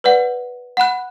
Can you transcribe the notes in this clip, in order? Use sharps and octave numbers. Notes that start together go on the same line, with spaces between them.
B4 D5 F#5
F#5 B5 F#6